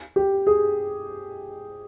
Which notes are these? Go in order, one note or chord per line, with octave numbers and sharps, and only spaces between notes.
G4
G#4